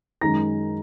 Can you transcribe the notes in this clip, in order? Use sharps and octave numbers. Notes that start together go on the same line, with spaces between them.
F#2 D#3 G#3 D#4 A#5 A#6